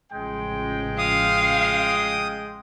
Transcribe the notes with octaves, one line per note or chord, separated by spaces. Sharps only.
A1 C#3 F3 G#3 G5
F5 D#6